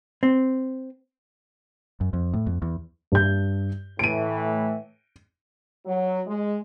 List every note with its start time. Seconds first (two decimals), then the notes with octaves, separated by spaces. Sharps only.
0.23 C4
2.01 F#2
2.13 F2
2.34 A2
2.47 F2
2.62 E2
3.12 G2 G6
3.99 A2 E3 A3 D7 D#7
5.86 F#3
6.27 G#3